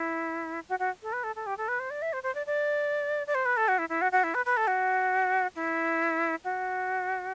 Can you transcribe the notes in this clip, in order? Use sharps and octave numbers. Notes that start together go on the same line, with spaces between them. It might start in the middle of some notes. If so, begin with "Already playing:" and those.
Already playing: E4
F#4
F#4
A4
B4
A4
A4
G4
A4
B4
C5
D5
E5
C5
C5
D5
D5
D5
C5
B4
A4
F#4
E4
E4
F#4
F#4
E4
B4
B4
A4
F#4
E4
F#4